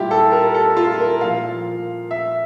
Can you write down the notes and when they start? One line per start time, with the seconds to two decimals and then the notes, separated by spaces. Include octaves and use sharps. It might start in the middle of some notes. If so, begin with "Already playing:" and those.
Already playing: A#2 G3 E4 F4 G4
0.11 A4
0.32 A#4
0.54 A4
0.77 F4
1.00 A#4
1.21 A#2 F3 F5
2.11 E5